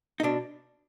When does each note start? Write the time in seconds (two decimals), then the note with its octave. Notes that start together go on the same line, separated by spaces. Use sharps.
0.20 D#4
0.23 B2 D4